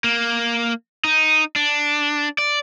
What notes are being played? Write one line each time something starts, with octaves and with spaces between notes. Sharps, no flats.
A#3
D#4
D4
D5